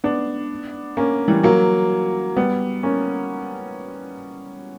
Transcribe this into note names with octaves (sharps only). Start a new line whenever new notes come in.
B3 D4
A#3 C#4
E3 G3
F#3 A#3
G3 B3
A#3 C#4